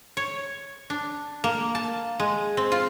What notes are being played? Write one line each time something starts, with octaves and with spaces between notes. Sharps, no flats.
C#5
D4
A#3
A5
G#3
C4
F4